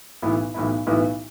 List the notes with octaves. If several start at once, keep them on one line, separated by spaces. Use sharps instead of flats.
B1 A2 E3 B3 E4
B1 A2 E3 B3 E4
B1 A2 E3 B3 E4